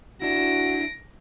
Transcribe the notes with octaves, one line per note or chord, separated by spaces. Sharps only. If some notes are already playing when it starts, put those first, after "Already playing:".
D4 E4 F#4 A#6 D7